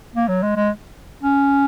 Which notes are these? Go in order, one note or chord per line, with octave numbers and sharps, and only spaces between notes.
A#3
F#3
G#3
G#3
C#4